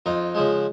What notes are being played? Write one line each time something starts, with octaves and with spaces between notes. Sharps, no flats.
F2 D#4 F4
C#3 F3 G#3